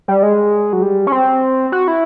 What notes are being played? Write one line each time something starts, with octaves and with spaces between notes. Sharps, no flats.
G3
G#3
F#3
G3
C#4
C4
F#4
E4